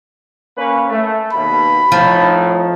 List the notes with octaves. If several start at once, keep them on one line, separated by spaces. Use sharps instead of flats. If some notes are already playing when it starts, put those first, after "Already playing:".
A#3 C#4 B4
A3
D#2 B2 B5
F2 A2 F3 D#4